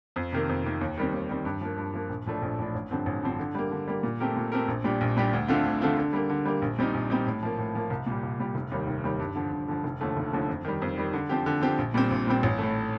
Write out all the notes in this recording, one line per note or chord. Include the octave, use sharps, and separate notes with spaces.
F2
C3 D#3 A#3
F2
C3 D#3 A#3
D#2
D#3 G3 C4
D#2
D#3 G3 C4
G2
F3 A#3
G2
F3 A#3
A#1
A2 F3 A3 D4
A#1
A2 F3 A3 D4
A1
G2 D3 F3 C4
A1
G2 D3 F3 C4
D3
G3 A#3
D3
G3 A#3
A#2
A3 C4 G4 A#4
A#2
A3 C4 G4 A#4
A#1
A#2 G3 D4 G4
A#1
A#2 G3 D4 G4
D2
D3 A3 C4 F4
D2
D3 A3 C4 F4
D3
G3 A#3
D3
G3 A#3
A#1
A#2 G3 C4 D#4
A#1
A#2 G3 C4 D#4
A2
F3 A#3
A2
F3 A#3
C2
A#2 G3
C2
A#2 G3
F1
D#2 D#3 G3
F1
D#2 D#3 G3
G2
D3 F3
G2
D3 F3
F1
D#2 D3 F3 A3
F1
D#2 D3 F3 A3
F2
D#3 G3
F2
D#3 G3
D3
F3 C4 G4
D3
F3 C4 G4
A#1
A#2 G3 C4
A#1
A#2 G3 C4
A1
A2 A3